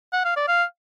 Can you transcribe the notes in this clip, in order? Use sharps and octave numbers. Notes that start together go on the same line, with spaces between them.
F#5
F5
D5
F5